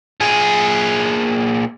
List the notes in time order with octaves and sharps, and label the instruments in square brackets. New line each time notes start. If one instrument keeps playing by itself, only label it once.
[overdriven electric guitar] A#2 G#4